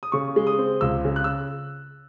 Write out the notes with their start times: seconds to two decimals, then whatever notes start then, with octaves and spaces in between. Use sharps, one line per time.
0.03 D#6
0.12 C#3 C#6
0.36 G#3
0.47 D#6
0.58 C4
0.81 C#2 E6
1.05 C#3
1.16 F#6
1.24 E6